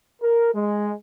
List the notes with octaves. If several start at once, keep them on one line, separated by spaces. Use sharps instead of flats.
A#4
G#3